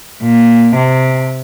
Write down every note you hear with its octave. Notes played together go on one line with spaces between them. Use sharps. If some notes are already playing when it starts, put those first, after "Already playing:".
A#2
C3